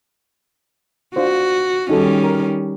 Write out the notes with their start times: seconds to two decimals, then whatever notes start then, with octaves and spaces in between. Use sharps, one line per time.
1.16 D4 F4 F#4 C5
1.89 D#3 G3 C#4 D#4 F#4 A4
2.24 A#4